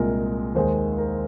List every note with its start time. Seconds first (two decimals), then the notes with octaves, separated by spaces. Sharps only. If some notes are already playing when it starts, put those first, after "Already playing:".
Already playing: C2 A#2 G#3 A#4
0.55 D#2 D#3 G#3 C5
0.98 A#4